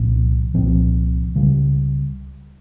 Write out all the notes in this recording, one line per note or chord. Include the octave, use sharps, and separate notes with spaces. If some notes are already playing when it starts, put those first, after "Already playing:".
Already playing: C2 A#2 F3 C4
C2 A#2 F3 C4
C#2 C#3 G3